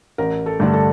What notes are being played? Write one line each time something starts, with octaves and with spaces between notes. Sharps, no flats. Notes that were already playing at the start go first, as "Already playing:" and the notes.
A1 A#4
A4
G2 D3 A3 D4
A4